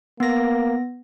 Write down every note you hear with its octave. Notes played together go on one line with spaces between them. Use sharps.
A#3 B3 A#6